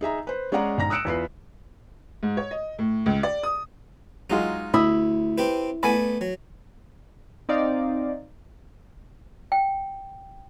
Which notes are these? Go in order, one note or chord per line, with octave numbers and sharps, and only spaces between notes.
D#4 G#4 E5 A#5
B4 C5
G#3 C#4 G#4 D5 F#5 A#5
A#1 G#2 A#5 A#6
D#6 E6 F#6 C#7 D7 E7
E2 F4 B4 C7
G#2
C#5
D#5
A2
C#2
D5
D#6
F#3 G#3 D#4 F4
D2 E4 B5 D#6 E6
C4 G4 B4
A3 B3 D5 G#5 B5
F#3
C4 D#4 D5 D#5 F5
G5